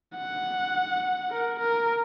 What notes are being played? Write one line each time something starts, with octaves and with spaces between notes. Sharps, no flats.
F#5
A#4
A#4